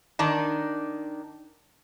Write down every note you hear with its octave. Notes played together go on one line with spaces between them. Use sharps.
D#3 D4 D#4